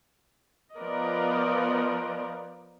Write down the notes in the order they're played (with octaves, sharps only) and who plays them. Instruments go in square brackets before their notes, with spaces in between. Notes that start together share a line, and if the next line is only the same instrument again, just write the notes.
[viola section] F3 B3 A#4 D5 D#5